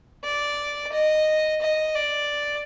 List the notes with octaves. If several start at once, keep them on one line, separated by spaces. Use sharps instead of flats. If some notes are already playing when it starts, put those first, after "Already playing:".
D5
D#5
D#5
D5